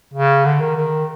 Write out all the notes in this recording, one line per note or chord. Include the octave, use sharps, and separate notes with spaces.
C#3
D3
D#3
D#3